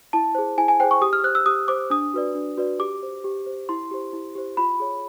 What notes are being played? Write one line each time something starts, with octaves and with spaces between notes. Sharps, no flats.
E4 A5
G#4 C5
E4 G#5
G#5
G#4 C5 G5
C#6
G4 D#6
F6
C5 F#6
E6
G4 D#6
C5 D6
D4 D#6
F#4 B4 D5
D4
F#4 B4 D5
G4 D6
C5
G4
C5
E4 C6
G4 C5
E4
G4 C5
F4 B5
G#4 C#5